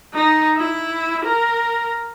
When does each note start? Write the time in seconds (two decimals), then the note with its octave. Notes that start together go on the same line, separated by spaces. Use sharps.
0.14 D#4
0.57 E4
1.25 A#4